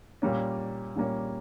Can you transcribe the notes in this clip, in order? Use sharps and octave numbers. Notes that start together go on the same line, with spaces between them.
A#2 G3 A#3 C#4
A#2 G3 A#3 C#4